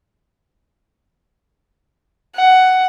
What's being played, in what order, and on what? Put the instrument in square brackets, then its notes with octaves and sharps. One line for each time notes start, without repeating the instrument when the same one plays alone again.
[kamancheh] F#5